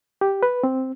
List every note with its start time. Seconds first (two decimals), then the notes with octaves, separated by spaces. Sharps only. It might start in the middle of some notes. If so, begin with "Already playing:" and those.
0.21 G4
0.43 B4
0.63 C4